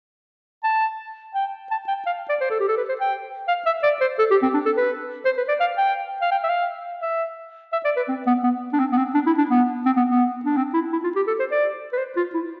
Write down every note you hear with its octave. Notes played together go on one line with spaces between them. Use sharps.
A5
G5
A5
G5
F5
D5
C5
A4
G4
A4
B4
C5
G5
F5
E5
D5
C5
A4
G4
C4
D4
A4
B4
C5
B4
D5
F5
G5
F5
G5
E5
F5
E5
E5
D5
B4
C4
B3
B3
D4
C4
B3
C4
D4
E4
D4
B3
C4
B3
B3
D4
C4
E4
E4
F4
G4
A4
C5
D5
B4
C5
F4
E4